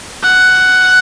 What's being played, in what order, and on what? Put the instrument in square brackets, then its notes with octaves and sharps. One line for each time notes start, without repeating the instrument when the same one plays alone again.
[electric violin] F#5